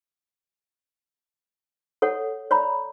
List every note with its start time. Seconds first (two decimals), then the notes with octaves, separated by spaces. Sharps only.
2.02 A4 C#5 F#5
2.51 C#5 D5 A#5 B5